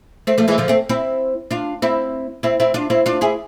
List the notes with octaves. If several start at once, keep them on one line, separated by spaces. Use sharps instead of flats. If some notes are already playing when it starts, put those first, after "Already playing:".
A3 C4
F3 A3
E3 G#3
D3 F3
A3 C4
C4 E4
D4 F4
C4 E4
C4 E4
C4 E4
D4 F4
C4 E4
D4 F4
E4 G#4